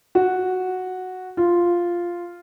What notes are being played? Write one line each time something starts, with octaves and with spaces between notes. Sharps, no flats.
F#4
F4